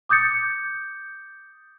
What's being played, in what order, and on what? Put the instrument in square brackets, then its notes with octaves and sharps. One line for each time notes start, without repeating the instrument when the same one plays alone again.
[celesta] D6 D#6 G6 A6 C#7